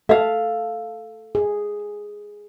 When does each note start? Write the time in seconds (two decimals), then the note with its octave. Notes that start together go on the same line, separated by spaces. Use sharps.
0.09 A4 E5 F5
1.35 G#4